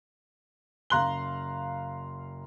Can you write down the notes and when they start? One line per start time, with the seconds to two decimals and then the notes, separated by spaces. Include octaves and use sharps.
0.90 F#1 F5 A#5 C6 F#6 G7